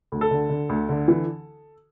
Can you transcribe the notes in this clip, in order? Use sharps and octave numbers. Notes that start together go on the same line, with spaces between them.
D2
A4
D3
D3
D2
D3
E3